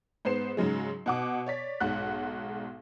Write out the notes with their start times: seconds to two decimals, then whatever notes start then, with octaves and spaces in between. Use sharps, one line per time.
0.25 G#2 B3 C5 C7 E7
0.57 G#2 C#3 F#3 G#3
1.06 B2 F#5 D6
1.46 C#5 D5 B6
1.80 B1 G#2 F#5 F#6